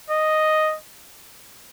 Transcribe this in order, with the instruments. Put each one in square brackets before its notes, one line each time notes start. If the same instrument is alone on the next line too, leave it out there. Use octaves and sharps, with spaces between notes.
[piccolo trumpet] D#5